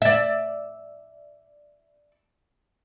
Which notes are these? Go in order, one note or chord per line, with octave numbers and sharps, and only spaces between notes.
D5 E5